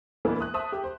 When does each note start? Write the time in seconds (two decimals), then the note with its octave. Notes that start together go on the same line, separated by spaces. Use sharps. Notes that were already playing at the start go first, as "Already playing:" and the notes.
0.25 E3 G#3 A#3 B3 D4 E4
0.40 D#6 F#6
0.54 C5 E5 A5 D#6
0.72 G4
0.84 C5